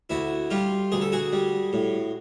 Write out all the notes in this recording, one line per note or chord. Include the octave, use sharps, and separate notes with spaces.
D2 E4 F#4
G3 F4 G4
D2 G#4
A4
F#4 G#4
G3
A2